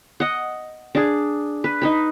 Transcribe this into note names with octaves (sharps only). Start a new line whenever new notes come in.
D#5 F#5
D4 G#4
B4
D#4 B4 B5